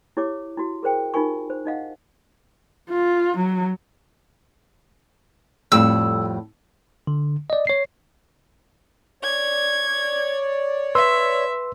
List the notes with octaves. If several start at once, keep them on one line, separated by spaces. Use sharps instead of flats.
E4 G4 C#5 D6
E4 F#4
G#4 A#4 C5 G5
D#4 F4 G4 A#4 G#5 C#6
C5
D#4 D#5 F5 F#5
F4
F#3
F2 A2 G3 E6
D3
D5 D#5
C#5 C7
C#5 D5 G#6
B4 E5 C6 E6